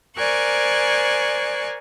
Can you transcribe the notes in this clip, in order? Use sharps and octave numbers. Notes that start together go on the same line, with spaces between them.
A#4 C5 D5 G#5 C#6 F#6